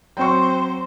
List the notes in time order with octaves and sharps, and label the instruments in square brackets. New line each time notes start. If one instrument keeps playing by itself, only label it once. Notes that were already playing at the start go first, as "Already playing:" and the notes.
[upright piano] F#3 C4 [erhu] C5 [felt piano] G5 C#6